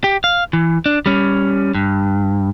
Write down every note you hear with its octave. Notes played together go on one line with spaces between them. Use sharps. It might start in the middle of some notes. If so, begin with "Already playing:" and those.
G4
F5
E3
D4
G3 C#4
G2